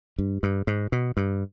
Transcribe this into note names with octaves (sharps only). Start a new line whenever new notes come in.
G2
G2
G#2
B2
G2